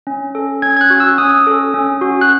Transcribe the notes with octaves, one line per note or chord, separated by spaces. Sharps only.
C#4
A4
C#4 G#6
G#6
F#6
F#4
E6
C#4 D#6
A4
C#4
F#4
F#6